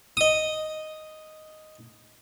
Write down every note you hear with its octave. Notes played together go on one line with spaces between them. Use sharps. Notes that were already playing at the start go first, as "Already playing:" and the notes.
D#5 D#6